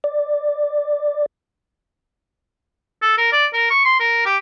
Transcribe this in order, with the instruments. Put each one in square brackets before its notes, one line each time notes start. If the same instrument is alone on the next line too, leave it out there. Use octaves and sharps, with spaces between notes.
[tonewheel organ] D5
[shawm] A4
A#4
D5
A#4
C#6
C6
A#4
G4